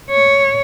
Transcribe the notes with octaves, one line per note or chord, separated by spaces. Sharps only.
C#5